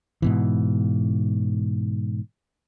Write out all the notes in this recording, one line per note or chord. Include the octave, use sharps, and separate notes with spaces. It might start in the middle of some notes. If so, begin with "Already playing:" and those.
G#2 B2 E3